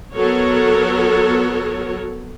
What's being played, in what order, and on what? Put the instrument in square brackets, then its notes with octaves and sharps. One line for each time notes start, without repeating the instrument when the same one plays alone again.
[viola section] F#3 B3 A4 A#4 C#5